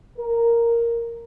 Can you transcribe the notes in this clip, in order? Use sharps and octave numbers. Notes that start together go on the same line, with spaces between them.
A#4